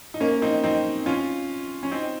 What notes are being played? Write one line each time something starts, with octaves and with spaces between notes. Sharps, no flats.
D#4
A#3 C#4
C4 D#4
C4 D#4
C#4 F4
C#4
C4 D#4